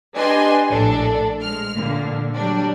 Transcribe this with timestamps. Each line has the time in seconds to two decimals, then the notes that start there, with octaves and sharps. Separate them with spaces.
0.15 D4 G4 B4 D#5 G#5 C6
0.70 A#1 A2 D4 A4
1.42 G#3 F6
1.76 A#2 D3 A#3
2.35 F#3 G3 D4